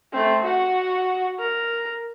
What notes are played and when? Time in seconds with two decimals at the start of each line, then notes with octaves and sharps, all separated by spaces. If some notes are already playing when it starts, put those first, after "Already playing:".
0.13 A3 C4
0.44 F#4 F#5
1.39 A#4